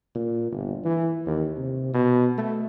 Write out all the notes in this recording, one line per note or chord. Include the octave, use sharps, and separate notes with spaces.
A#2
G1
E3
D#2
C3
B2
A3